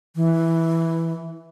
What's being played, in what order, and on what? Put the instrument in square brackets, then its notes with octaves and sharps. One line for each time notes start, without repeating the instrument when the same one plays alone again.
[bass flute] E3